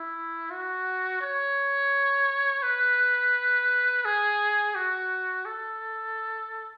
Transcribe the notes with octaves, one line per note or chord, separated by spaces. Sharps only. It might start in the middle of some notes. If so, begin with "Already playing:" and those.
Already playing: E4
F#4
C#5
B4
G#4
F#4
A4